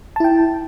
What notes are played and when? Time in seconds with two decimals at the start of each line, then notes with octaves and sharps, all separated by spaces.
0.16 A5
0.20 E4
0.24 G5